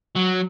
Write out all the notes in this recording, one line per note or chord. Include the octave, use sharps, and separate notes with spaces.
F#3